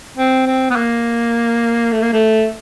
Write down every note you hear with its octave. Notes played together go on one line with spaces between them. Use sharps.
C4
C4
B3
A#3
A3
A#3
A3